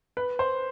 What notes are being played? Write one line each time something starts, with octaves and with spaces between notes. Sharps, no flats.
B4
C5